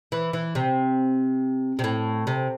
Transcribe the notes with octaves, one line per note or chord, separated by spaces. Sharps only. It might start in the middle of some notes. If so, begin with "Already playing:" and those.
E3
E3
C3
C3
A2
C3